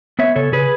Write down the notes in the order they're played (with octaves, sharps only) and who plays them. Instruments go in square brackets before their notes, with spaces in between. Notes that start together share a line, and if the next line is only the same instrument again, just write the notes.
[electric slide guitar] B3 C#5 E5
C#3 A4 C#5
C#3 G#4 B4